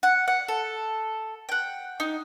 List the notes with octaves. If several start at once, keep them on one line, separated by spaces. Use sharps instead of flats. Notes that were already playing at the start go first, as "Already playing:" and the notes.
F#5
F#5
A4
F#5 G5
D#4